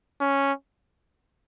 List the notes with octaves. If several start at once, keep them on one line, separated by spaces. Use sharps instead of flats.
C#4